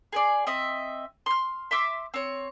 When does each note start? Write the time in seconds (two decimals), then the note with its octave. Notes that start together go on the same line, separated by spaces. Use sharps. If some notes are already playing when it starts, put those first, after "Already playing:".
0.13 G#4 B4 D5
0.47 C4 D#5 E5
1.26 C6 F6
1.71 E5 C6 D6 E6
2.14 C4 C#5